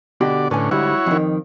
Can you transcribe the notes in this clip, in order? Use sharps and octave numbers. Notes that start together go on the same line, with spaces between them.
B2 D3 F#4 G4 D5
A2 D3 C#4 B4 G#5
G#2 D3 G3 E4 F#4 C#5
F2 D#3